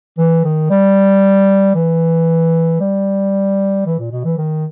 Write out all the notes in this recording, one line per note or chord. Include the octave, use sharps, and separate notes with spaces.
E3
D#3
G3
E3
G3
E3
A#2
B2
E3
D#3